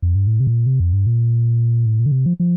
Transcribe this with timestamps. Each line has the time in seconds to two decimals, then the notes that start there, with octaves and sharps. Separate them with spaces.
0.02 F2
0.15 G2
0.27 A2
0.40 C3
0.47 A#2
0.66 C3
0.80 F2
0.93 G2
1.07 A#2
1.86 A2
1.99 A#2
2.06 D3
2.12 C3
2.26 F3
2.40 F3